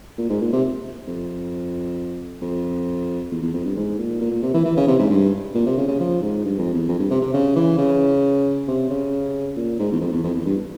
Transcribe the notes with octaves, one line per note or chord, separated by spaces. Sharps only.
A#2
G#2
A#2
C3
F2
F2
E2
E2
F2
G2
G#2
A#2
A#2
A#2
C3
E3
E3
C#3
C3
G#2
G2
A#2
C3
C#3
C#3
F3
G#2
G2
F2
E2
F2
G2
C3
C3
C#3
E3
C#3
C3
C#3
A#2
G#2
E2
F2
E2
F2
E2
G2